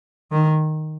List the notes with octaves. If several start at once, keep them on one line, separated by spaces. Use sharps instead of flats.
D#3